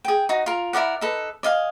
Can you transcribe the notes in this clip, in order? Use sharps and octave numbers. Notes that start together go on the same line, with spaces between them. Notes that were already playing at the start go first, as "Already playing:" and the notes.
G#4 G5
D#4 F#4
F4 A#4
E4 A#4 D5 F#5
D#4 A4 B4
D5 D#5 F5 G#5